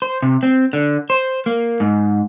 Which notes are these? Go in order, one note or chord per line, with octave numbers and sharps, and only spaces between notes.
C5
C3
C4
D3
C5
A#3
G#2